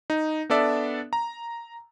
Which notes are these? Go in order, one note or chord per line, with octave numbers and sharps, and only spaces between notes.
D#4
B3 D4 A4 D5 E5
A#5